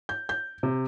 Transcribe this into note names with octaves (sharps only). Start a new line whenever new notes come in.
G6
G6
C3